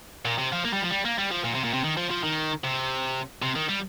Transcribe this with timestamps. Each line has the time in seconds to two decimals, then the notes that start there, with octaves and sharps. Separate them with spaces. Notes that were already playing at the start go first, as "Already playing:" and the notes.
0.25 A#2
0.38 C3
0.53 F3
0.65 A#3
0.73 G3
0.82 F3
0.90 G3
1.05 A#3
1.18 G3
1.31 F3
1.44 A#2
1.55 C3
1.64 A#2
1.74 C3
1.84 D#3
1.97 F3
2.11 F3
2.23 D#3
2.64 C3
3.42 C3
3.56 D#3
3.69 G3